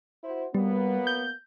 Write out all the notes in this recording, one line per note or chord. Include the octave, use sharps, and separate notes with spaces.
E4 F#4 C5
F#3 G3 A#3 B3
G6